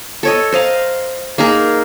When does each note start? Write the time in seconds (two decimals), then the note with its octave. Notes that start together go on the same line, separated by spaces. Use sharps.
0.23 A4 C#5 D#5
0.52 C5 D#5 F5 A#5
1.38 A#3 D#4 G#4 A#4